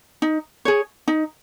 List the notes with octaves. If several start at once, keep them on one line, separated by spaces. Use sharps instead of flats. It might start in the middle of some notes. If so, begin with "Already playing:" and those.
D#4
G#4 C#5
D#4